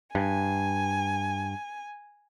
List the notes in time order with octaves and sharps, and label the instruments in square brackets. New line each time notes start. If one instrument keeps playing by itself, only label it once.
[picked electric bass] G2 [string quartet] G#5